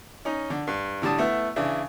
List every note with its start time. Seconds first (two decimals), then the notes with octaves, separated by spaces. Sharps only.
0.25 C#4 D#4
0.50 D3
0.67 G2
1.02 A2 D3 G3 A5 D#6
1.18 A3 B3 E4
1.56 C#3 E3 D4 E4